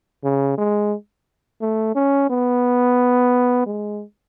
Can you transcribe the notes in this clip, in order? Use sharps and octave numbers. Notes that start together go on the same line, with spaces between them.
C#3
G#3
A3
C#4
B3
G#3